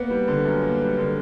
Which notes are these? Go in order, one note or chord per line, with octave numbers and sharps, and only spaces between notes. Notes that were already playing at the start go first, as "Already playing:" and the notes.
Already playing: A#3 B3
G3
D3
F#2
A#3
G3
D3